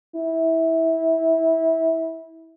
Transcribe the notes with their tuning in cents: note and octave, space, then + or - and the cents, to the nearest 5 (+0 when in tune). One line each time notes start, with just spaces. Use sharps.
E4 -20